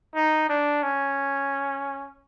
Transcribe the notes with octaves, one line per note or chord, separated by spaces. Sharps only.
D#4
D4
C#4